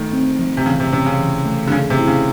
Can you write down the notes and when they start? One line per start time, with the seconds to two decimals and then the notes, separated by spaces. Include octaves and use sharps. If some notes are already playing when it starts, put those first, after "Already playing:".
Already playing: D#3 A3
0.13 C4
0.39 F3
0.57 C3
0.66 C#3 E3
0.80 C3
0.93 C3 C#4
1.06 C#3
1.19 E3
1.45 A3
1.67 D3
1.72 C#3 G#3
1.90 C3
1.99 E4
2.07 C#3